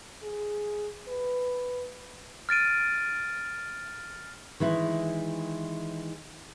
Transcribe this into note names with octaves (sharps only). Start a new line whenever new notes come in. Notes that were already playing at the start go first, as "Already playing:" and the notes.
G#4
B4
F6 A6 D7 D#7
D#3 E3 G#3 E4